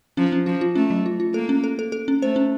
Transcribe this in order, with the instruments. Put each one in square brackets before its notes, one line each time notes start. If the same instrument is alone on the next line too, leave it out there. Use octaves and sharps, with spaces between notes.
[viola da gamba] F3 [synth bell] C#4
[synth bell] C#4
[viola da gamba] F3 [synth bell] F4
[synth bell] F4
[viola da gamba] A3 [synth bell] C#4
[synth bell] F#3
F4
F4
[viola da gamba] A#3 [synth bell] A4
[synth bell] C#4
A4
A4
A4
C#4
[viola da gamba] A3 [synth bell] C5
[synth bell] C#4